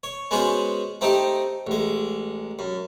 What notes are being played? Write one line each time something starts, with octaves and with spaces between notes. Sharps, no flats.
C#5
G#3 B3 C#4 F#4 G#4 C5
A3 C4 D#4 G4 D#5
A1 G#3
F#2